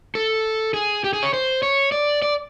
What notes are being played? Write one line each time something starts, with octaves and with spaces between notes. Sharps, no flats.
A4
G#4
G4
G#4
C#5
C5
C#5
D5
D5